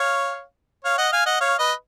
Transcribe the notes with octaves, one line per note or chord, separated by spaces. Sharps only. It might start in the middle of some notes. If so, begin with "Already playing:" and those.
Already playing: C#5 F5
C#5 F5
D#5 F#5
F5 G#5
D#5 F#5
C#5 F5
B4 D#5